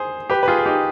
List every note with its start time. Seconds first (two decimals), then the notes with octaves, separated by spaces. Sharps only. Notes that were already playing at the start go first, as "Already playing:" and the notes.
Already playing: G#4 C5
0.30 G4 B4
0.43 B4
0.48 F4 G#4
0.58 G#4
0.66 D#4 G4